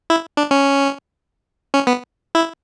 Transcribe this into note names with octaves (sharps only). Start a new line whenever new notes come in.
E4
D4
C#4
C#4
B3
E4